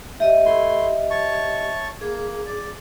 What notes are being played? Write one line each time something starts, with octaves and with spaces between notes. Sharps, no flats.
G4 D#5 E5
A3 E4 C6
C#5 A5 C#6
A#3 G#4
D5